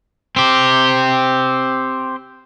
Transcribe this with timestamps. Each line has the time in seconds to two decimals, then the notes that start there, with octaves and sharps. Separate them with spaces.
0.36 C4 G4